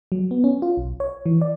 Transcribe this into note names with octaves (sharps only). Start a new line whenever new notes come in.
F#3
B3
C#4
F4
B1
C#5
E3
D5